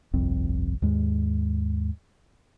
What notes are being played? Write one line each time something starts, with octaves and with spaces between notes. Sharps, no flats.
G1 C2 F2 C4
D#2 G#2 G#3